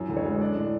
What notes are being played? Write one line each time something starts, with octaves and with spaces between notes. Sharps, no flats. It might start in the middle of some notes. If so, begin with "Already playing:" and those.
Already playing: F#2 E3
D2
C#5
G#3
D4 D5
A2